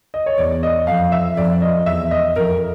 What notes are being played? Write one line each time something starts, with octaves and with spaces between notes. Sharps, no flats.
D#5
C#5
E2 D5
D#5
F2 F5
E5
F2 D5
D#5
E2 E5
D#5
F2 A#4